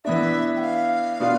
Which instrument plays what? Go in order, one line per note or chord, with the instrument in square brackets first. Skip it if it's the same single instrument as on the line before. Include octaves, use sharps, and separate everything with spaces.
[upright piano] E3 B3 D4 [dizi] E5
[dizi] G5
F5
[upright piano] B2 B3 D4 F4